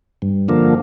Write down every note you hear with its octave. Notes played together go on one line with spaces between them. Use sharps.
G2
D3 F3 A#3